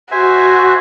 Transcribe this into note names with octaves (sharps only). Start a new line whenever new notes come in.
F#4 C5 E5 G#5